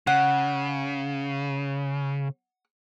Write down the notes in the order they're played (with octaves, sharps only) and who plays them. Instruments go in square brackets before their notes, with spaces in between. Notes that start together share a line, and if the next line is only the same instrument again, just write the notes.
[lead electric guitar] C#3 [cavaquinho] F#5